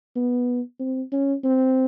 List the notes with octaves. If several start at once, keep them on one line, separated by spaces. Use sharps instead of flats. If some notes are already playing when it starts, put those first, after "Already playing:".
B3
C4
C#4
C4